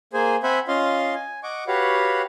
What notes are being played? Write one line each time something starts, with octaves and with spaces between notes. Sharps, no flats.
A#3 G#4 C5 G#5
C4 C5 E5 F#5 G#5 B5
C#4 F4 D#5 F5 C6
G#5
D#5 F#5 C#6 D6
F#4 G4 B4 C#5 F5 F#5